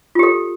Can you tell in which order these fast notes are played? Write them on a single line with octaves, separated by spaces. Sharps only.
F4 G4 A4